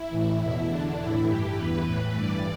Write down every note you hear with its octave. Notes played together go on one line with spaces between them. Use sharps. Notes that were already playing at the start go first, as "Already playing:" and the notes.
Already playing: E4
A2 E3
E2 B2
E2 D3 D4
A2 E3 E4
G2 E3 G4
E2 E3 B4
A2 E3 B4
G2 E3 D5